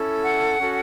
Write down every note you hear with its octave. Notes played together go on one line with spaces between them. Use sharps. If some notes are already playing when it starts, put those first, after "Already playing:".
Already playing: C#4 E4 A4
F#5
C#4 F#4 A4